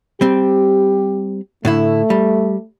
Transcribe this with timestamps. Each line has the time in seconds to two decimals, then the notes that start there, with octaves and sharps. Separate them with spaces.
0.21 G3 C4 G4
1.65 A2 D3 A3 E4
2.10 G3